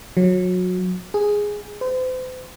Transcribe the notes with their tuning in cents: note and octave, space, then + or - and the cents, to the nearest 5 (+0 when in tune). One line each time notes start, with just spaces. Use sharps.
F#3 -25
G#4 -5
C5 -40